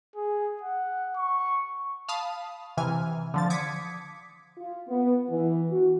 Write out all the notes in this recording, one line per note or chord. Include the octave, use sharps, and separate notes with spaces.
G#4
F#5
C#6
F5 A5 B5 D#6
C3 E3 G#5 F6
D3 F3 A6
D6 D#6 G#6 B6 C#7
F4
B3
E3
F#4